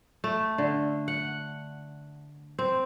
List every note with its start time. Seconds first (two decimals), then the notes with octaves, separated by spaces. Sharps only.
0.24 A3
0.58 D3
1.08 F#5
2.59 C4